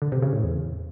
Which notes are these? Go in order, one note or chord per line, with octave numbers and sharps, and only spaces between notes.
D3
C3
C#3
A2
E2